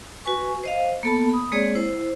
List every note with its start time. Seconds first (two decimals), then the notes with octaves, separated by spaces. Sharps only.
0.25 F#4 B4 G#5 C#6
0.63 C5 D#5 F5
1.03 A#3 B3 A4 A5 B5
1.29 B5 D#6
1.52 G#3 A#3 C4 G#4 C#5 D5
1.75 E4 C5